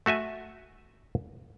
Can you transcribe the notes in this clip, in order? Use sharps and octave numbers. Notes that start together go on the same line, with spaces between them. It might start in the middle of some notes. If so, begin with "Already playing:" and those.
A3 F#4 E5 G#5